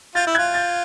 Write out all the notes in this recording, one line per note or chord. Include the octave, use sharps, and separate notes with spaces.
F4 G6 A6
E4
F4 F#6 G#6
G6 A6